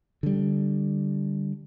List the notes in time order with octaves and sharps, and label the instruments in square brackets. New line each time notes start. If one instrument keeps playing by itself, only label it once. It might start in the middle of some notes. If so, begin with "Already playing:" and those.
[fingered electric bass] D3 G3